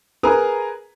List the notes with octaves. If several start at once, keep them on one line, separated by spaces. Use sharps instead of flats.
G#4 A#4 B4 A#5 D#6